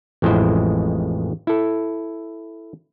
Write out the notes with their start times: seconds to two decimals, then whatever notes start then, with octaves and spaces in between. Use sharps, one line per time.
0.22 A1 F2 G#3 E4 C5 D#5
1.47 E4 A4